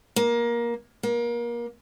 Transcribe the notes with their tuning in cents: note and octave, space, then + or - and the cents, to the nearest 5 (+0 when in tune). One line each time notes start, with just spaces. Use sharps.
A#3 +20
A#3 +30